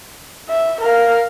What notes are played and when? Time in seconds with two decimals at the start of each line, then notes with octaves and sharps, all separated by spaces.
0.49 E5
0.81 A#4 F5